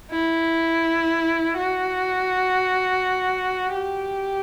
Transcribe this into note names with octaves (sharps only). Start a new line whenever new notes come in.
E4
F#4
G4